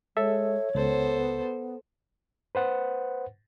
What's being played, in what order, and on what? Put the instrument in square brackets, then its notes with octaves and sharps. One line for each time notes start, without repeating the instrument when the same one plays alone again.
[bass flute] G#3 [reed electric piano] A4 E5 [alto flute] C#5
[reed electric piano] C#2 [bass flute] B3 [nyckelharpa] A4 C5
[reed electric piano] B4 C5 F#5